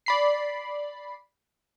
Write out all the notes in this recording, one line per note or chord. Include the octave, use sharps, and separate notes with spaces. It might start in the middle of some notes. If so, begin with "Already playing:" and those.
D5 B5 C7